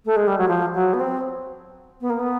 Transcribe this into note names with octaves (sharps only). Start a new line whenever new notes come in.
A3
G#3
G3
F#3
F3
F#3
B3
C4
B3
A#3
B3